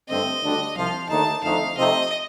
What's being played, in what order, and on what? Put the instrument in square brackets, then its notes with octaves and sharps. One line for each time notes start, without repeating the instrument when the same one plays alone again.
[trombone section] G2 D3 A3 C4 [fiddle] D#5
[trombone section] D2 D3 G3 D4
[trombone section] C2 C3 F3 [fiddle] F5
[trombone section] D#2 D3 A3 D#4 [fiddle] A5
[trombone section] F2 D3 A3 D#4 [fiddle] F5
[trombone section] C3 F3 A3 C4 D#4 [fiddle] D#5